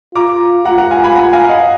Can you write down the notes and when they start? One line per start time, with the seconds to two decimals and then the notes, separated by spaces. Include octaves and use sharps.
0.15 F4 A#5 D6
0.65 F4 F#5 A#5
0.78 F#5 A#5
0.90 F5 G#5
1.04 G#5 B5
1.16 F#5 A#5
1.33 F5 G#5
1.49 D#5 F#5